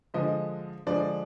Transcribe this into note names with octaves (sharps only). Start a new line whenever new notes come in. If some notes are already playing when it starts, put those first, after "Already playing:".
D3 F3 G#3 D#5
D3 F3 G#3 D5